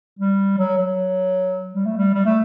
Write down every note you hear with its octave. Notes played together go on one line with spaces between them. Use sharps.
G3
F#3
F#3
G3
A3
G3
G3
A3